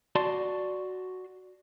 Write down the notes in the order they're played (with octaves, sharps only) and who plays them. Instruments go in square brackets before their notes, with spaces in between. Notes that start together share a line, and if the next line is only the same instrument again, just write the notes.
[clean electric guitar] F#4 D5 A5 C6